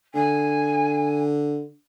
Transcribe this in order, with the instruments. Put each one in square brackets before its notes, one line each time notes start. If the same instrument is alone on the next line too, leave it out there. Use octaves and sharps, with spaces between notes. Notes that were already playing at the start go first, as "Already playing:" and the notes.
[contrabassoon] D3 [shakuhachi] G#5